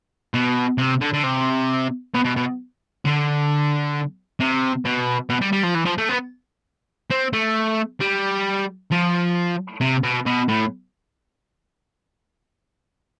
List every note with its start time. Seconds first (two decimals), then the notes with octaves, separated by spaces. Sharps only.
0.34 B2
0.78 C3
1.01 D3
1.13 D3
1.23 C3
2.14 B2
2.25 B2
2.37 B2
3.05 D3
4.40 C3
4.85 B2
5.30 B2
5.42 G3
5.53 G3
5.64 F3
5.75 E3
5.86 F3
5.98 A3
6.09 B3
7.11 C4
7.33 A3
8.01 G3
8.91 F3
9.81 C3
10.03 B2
10.26 B2
10.48 A2